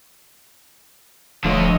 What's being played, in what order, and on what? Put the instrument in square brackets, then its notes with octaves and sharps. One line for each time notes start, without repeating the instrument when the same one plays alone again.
[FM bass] D#1 [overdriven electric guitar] D3 A3 [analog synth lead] F3 [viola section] C#5 D#5